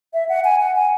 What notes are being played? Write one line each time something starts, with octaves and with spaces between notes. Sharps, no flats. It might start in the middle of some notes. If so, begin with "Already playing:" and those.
E5
F#5
G#5
F#5
G#5